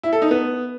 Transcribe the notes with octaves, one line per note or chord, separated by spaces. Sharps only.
E4
A4
D#4
B3